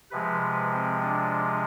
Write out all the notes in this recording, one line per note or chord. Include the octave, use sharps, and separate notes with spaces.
C3 F3 G#3 B4
B4
C4
D4